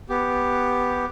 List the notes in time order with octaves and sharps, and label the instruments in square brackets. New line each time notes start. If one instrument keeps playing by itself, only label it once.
[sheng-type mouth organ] B3 G4